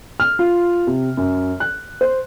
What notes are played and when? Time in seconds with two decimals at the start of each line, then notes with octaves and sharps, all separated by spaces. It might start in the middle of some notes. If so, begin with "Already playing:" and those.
0.20 F6
0.39 F4
0.87 C3
1.17 F#2
1.60 F#6
2.01 C5